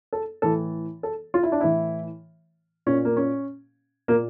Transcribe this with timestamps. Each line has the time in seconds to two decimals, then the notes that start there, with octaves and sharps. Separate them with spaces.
0.13 A4
0.42 A2 E3 A4
1.03 A4
1.34 F4
1.43 E4
1.52 D4
1.61 A2 E3 E4
2.86 A#2 C#4
3.05 A#3
3.17 C#4
4.08 A#2 A#3